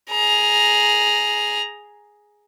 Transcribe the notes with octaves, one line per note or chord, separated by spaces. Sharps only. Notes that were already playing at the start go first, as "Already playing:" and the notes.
G#4 A#5